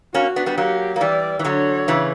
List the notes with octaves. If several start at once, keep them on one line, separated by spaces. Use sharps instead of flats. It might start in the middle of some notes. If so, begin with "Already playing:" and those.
A#3 C#4 F#4
B3 D4
G3 B3
F#3 A#3 G4
A#3
E3 G3 D5
E3
D3 F#3 C#5
C#3 E3